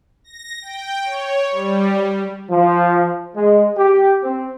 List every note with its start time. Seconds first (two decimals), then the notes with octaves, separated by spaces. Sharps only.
0.24 A#6
0.62 G5
1.02 C#5
1.51 G3
2.51 F3
3.36 G#3
3.77 G4
4.23 C4